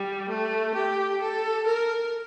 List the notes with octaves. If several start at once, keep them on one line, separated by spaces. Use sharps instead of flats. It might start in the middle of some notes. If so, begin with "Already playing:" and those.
Already playing: G3
A3
G4
A4
A#4